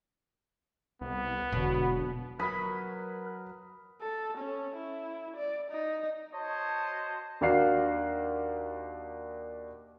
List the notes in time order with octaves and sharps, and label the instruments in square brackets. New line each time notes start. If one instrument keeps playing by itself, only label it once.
[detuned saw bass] C2 [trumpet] B3
[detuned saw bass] E1 [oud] B2 [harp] D3 F#3
[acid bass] F#3 [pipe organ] A#4 B4 [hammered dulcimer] B5 [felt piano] D#6 B6
[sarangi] A4
C#4
E4
D5
D#4
[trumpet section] F#4 C5 C#5 D#5 A5
[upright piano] D#2 D4 F#4 F5 C7